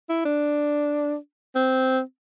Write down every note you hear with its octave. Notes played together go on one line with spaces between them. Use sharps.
E4
D4
C4